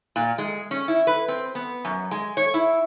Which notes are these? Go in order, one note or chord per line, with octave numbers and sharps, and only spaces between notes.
A#2
G#3
C#4
E4
B4
C4
B3
F#2
G#3
C#5
E4